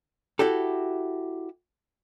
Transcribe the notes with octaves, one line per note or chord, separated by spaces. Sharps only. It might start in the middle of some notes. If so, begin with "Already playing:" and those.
E4 F#4 G4 A4